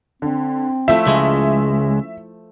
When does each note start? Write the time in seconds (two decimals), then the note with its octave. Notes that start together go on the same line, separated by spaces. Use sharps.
0.22 D3 C4
0.88 F3 A3 E4 E5
1.07 C#2 G#3 C#4